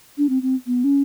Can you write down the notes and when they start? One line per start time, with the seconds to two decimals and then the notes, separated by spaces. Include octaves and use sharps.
0.18 D4
0.29 C4
0.42 C4
0.67 B3
0.84 C#4